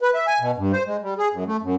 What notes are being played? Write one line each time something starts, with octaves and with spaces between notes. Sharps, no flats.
B4
E5
G#5
B2
G2
C5
G#3
G3
G#4
F#2
A3
F#2